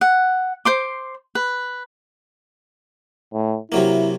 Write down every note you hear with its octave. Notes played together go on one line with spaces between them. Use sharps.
F#5
C5 C6 D6
B4
A2
C3 F#3 A#3 E4